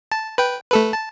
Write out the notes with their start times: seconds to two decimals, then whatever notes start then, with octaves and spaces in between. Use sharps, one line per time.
0.12 A5
0.38 B4 G5
0.71 A3 A4 B4
0.93 A5